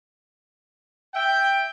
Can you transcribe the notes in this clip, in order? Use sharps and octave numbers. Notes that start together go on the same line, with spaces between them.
E5 G5